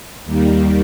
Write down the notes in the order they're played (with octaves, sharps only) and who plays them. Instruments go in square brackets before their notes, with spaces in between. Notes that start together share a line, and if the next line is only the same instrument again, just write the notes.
[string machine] D#2 D#3 G3 A#3